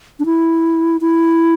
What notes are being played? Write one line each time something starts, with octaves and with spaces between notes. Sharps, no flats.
D4
E4
E4